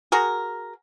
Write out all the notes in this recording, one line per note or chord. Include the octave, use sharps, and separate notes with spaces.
F#4 G#4 A#4